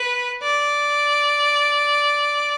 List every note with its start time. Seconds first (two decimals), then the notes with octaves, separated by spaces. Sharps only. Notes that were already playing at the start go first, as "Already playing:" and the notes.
Already playing: B4
0.42 D5